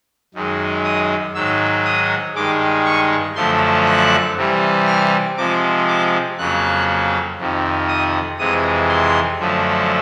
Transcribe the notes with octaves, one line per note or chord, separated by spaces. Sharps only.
F#2 D#3 G#3
D#6
G#2 D#3 F#3 E6
D#6
G2 D#3 G#3 D6
C#6
F#2 D3 F3 A3 C6
F#6
C3 E3 G3
F6
C3 F3 G#3 D6
D6
F2 C#3 F#3 A#3 F#6
F2 C3 D#3
D#6
F2 C3 E3 G#3 D#6
C6
F#2 D3 F3 A3